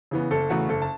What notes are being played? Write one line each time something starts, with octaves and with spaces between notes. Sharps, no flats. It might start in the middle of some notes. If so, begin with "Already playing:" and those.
C#3 E3 B3
F#1 A4
E2 C#3 A3 F#4
F#1 A4
A5